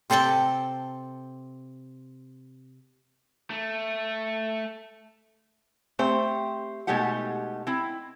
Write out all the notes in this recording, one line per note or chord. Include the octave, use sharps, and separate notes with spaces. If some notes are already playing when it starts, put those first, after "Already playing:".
C3 C4 A4 G5 A5
A3
A3 C4 G4 C5 G5
B2 G#3 A3 D#4 G4 F#5
C4 E4